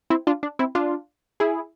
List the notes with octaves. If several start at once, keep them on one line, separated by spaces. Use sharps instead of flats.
C4 E4
D4 F4
D4
C4 E4
D4 F4
E4 G#4